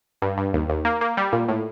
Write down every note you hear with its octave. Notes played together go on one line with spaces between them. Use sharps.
G2
G2
D#2
D#2
A#3
A#3
G3
A#2
A2